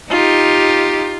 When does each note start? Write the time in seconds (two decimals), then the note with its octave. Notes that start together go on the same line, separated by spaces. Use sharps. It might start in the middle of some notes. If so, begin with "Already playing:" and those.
0.10 D#4 F4 G4